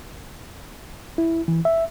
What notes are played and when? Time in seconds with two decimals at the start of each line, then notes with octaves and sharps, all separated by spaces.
1.18 E4
1.48 E3
1.65 E5